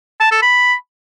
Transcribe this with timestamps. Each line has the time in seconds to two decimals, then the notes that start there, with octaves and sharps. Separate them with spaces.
0.20 A5
0.31 A4
0.42 B5